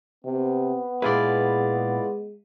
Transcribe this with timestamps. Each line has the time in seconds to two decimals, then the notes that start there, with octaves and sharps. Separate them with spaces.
0.25 C3 B3
1.02 A#2 G#3 E4 F4 G#4 B4 D5